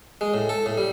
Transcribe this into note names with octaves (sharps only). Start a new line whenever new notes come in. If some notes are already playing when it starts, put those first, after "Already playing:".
G#3
A2
A4
A2
G3